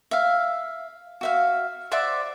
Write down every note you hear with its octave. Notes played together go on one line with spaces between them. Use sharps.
E5 F5
F#4 E5 F5
C5 D5 E5 F#5